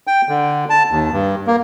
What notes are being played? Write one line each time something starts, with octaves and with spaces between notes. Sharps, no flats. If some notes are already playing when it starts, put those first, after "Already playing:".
G5
D3
A5
D#2
G2
A#3